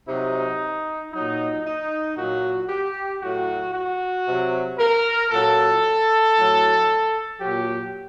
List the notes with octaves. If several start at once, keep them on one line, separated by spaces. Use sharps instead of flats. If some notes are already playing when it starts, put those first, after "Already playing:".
C3 F#3 D#4
A#2 F#3 D#4
D#4
A#2 F#3 F#4
G4
A2 F#3 F#4
F#4
C3 F#3
A#4
A#2 F#3 A4
A2 F#3
A#2 F#3 G4